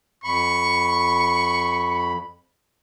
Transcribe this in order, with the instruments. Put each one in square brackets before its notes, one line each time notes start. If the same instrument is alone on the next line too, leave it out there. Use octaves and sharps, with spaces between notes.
[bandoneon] F2 B5 [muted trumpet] C#6